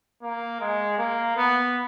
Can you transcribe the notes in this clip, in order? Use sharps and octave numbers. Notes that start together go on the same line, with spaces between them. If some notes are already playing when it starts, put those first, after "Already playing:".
A#3
G#3
A#3
B3